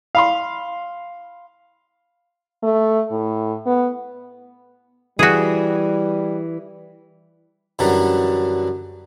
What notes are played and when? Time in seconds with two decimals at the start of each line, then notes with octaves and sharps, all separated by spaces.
0.15 F5 B5 C6
2.63 A3
3.11 A2
3.66 B3
5.19 E3 G3 F#4 G#4
7.79 F#2 D3 E3 F#3 G3